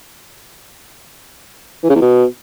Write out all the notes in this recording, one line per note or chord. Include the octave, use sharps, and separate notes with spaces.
E3
C#3
E2
B2